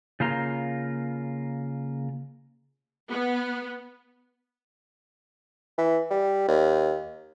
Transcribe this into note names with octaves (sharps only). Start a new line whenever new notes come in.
C#3 A#3 F4 A#5
B3
E3
G3
D#2